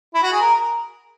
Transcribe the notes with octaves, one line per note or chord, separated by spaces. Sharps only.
E4
F#4
G#4
A#4